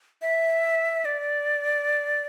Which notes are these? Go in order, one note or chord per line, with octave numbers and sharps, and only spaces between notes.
E5
D5